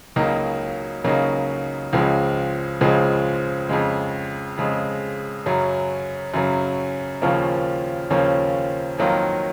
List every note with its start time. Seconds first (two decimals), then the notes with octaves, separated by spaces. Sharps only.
0.16 C#2 C#3 F#3 A#3 D#4
1.04 C#2 C#3 F#3 A#3 D#4
1.93 C#2 C#3 F3 G#3
2.81 C#2 C#3 F3 G#3
3.69 F2 C#3 G#3
4.58 F2 C#3 G#3
5.46 F#2 C#3 F#3
6.34 F#2 C#3 F#3
7.22 D#2 C#3 F3 A#3 C#4
8.10 D#2 C#3 F3 A#3 C#4
8.99 F2 D#3 F#3 A#3 F4